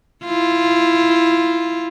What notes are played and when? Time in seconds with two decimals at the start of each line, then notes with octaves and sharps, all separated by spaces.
0.24 E4 F4